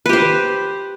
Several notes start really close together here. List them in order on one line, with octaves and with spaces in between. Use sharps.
B4 G4 C5